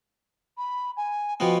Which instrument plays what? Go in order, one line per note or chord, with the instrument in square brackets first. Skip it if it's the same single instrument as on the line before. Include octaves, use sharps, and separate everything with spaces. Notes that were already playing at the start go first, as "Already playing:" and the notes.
[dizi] B5
G#5
[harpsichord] B2 F3 B3 [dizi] G5